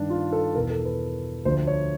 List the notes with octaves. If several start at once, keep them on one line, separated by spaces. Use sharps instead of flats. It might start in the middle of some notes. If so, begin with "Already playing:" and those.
Already playing: G2 D#3 D4
F4
A4
E2 B2 A#4
A4
B4
D2 D3 F3 C5
C#5